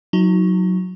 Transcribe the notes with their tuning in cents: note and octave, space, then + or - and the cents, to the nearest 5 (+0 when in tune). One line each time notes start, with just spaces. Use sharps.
F#3 -10 D#4 +30 A#5 -35